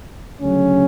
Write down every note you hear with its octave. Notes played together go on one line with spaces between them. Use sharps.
D2 C#3 F#3 C#4